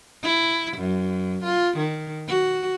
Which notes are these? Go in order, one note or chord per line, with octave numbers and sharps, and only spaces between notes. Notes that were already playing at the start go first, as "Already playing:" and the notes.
E4
F#2
F4
D#3
F#4